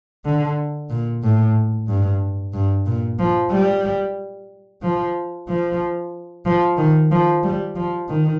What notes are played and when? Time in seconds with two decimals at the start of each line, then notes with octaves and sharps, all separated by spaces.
0.25 D3
0.90 A#2
1.23 A2
1.88 G2
2.53 G2
2.86 A#2
3.19 F3
3.51 G3
4.82 F3
5.48 F3
6.45 F3
6.78 D#3
7.11 F3
7.43 G3
7.76 F3
8.08 D#3